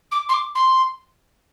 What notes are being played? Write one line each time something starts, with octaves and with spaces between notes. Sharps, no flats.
D6
C6
D6
C6